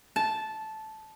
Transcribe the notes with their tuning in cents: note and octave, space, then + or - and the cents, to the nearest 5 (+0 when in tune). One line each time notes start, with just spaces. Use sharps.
A5 -10